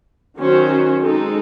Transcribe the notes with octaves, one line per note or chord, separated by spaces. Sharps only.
D#3 F#3 C#4 F#4 C5
G#3 C4 D#4 A4